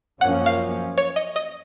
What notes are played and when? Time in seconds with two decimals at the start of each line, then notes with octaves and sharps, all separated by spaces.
0.21 F#2 F3 A#3 C#4 F#5
0.46 F5
0.98 C#5
1.16 D#5
1.36 D#5